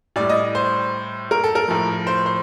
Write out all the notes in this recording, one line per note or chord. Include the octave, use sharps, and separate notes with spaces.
A2 G3 D5
D#5
C5
A#4
A4
A#4
A2 F3
C5
C5